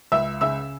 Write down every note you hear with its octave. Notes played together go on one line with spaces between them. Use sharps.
C#2 E5 E6
C#3 E5 E6